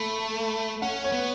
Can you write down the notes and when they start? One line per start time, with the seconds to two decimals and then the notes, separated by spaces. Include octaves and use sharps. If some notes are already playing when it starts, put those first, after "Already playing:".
Already playing: A3 B5
0.82 C#4 F#5
1.04 C#5
1.12 B3